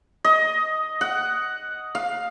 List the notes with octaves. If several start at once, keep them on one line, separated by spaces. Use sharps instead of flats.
D#5
F#5
F5